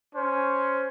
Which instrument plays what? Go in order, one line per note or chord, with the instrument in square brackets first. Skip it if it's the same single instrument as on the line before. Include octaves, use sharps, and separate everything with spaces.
[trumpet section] C#4 C5